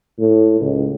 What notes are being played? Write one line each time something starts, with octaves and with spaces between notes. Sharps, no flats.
A2
C#2